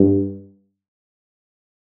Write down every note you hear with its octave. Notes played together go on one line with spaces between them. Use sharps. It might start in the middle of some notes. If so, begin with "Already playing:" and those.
Already playing: G2